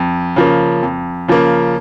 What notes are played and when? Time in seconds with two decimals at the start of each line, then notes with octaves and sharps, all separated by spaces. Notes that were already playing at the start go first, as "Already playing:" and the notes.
Already playing: F2
0.36 C#3 F3 A#3
0.83 F2
1.28 C#3 F3 A#3